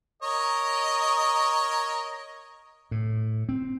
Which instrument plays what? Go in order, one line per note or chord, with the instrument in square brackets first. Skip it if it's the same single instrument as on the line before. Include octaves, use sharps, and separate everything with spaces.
[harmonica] A#4 C#5 D#5
[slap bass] A2
C4